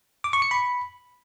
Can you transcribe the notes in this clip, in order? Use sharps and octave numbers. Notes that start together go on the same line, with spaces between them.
D6
C#6
C#7
B5